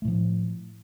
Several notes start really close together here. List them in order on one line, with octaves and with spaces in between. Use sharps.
A3 A2 F3